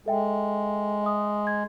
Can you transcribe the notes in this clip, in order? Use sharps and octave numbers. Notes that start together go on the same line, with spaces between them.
G#3 A4 E5 G5
E5 D#6
G#6